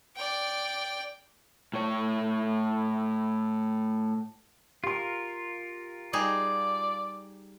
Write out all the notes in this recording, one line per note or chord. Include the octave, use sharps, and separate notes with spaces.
D5 G5
A2 C#5
F4 G4 A#4 C6
G3 D#4 G#4 D5